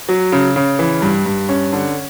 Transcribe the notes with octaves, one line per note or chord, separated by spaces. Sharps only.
F#3
C#3
C#3
E3
G2
G2
C#4
D3